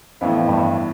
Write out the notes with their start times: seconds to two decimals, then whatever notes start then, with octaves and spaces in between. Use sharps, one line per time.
0.21 F2 A2 E3 B3 E4
0.48 G2